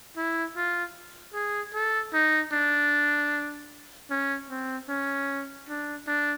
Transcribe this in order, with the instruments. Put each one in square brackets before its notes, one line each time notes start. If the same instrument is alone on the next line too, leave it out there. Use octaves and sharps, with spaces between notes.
[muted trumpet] E4
F4
G#4
A4
D#4
D4
C#4
C4
C#4
D4
D4